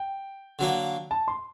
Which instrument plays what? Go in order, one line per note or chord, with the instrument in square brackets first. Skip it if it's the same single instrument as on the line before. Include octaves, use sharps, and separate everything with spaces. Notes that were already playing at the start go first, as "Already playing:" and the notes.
Already playing: [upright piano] G5
[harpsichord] D3 F#3 A#3
[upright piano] A5
C6